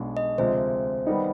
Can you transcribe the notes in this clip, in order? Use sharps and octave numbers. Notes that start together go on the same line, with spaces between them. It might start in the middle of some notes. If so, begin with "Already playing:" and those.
Already playing: B1 B2 G#3 D4 G#4
D#5
D2 C3 F3 G#3 C5
D#3 G3 B3 D#4